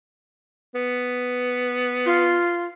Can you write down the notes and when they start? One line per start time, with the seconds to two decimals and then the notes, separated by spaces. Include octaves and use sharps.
0.75 B3
2.06 F4